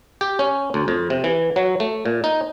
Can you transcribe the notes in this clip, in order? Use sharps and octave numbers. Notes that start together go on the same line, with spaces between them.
G4
C#4
D2
F2
C3
E3
F#3
A3
A#2
D#4